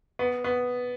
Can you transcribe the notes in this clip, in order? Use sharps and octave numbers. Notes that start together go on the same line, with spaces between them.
B3
B3